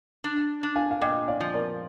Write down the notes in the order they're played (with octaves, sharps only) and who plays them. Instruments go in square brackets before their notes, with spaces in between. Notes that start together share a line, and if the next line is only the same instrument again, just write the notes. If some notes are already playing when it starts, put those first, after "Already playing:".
[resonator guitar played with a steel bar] D4
D4
[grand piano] F5 G#5
F5
[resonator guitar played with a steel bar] A#2 [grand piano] D#5 G5
[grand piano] D5 F5
[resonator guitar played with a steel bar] F3
[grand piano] A#4 D5